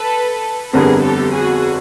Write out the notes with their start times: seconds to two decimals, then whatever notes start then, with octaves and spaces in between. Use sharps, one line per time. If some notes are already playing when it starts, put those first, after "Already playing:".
Already playing: A4 B4
0.73 G1 F2 D3 G3 B3 G#4 A#4
1.02 G4 A4
1.33 F#4 G#4